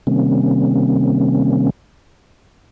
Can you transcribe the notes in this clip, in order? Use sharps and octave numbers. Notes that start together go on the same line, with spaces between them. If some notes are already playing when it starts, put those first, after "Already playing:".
C3 D#3 G3 A#3 C4 C#4